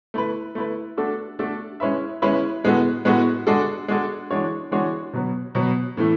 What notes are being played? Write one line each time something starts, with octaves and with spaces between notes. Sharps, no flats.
A3 E4 B4
A3 E4 B4
A3 D4 F#4 A4
A3 D4 F#4 A4
G#3 C#4 E4 B4 E5
G#3 C#4 E4 B4 E5
A2 G#3 B3 F#4 A4
A2 G#3 B3 F#4 A4
G#3 D4 F#4 A4
G#3 D4 F#4 A4
E3 G#3 D4 F#4 C#5
E3 G#3 D4 F#4 C#5
B2 F#3 B3
B2 F#3 B3
A2 E3 A3